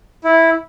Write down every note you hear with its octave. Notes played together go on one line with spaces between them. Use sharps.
E4